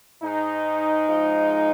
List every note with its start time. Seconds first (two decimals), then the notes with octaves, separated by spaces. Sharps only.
0.22 G#2 G#3 D#4
1.08 G#2 F3 G#3